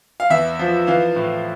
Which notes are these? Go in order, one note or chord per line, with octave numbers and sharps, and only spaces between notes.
F5
E2 E5
F3
E3 F5
A2